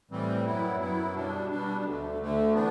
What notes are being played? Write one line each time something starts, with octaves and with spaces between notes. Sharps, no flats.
A2 E3 G3 C4
F#2 F#3 B3 E4
F#2 F#3 B3 E4
B2 G3 D4
B2 G3 D4
D2 D3 A3
D2 D3 A3
E3 B3 D4